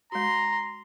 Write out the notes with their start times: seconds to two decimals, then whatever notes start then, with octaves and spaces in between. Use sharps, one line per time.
0.12 G#3 F#4 A#5 C6